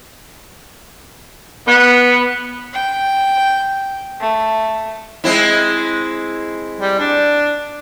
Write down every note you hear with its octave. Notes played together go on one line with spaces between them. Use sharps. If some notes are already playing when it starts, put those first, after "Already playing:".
B3
G5
A3
G#3 C4 E4
G3
D4